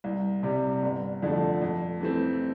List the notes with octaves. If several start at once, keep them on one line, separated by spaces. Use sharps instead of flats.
C2
C3 G3
G1
F2 D3 F3 A3
F2
E3 A3 C4